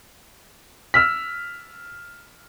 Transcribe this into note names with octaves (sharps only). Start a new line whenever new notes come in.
E6 F6 B6